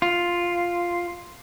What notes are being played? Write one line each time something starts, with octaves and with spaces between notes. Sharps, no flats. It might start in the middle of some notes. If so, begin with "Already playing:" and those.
F4